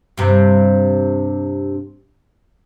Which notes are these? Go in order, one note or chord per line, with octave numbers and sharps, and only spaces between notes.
G2 C3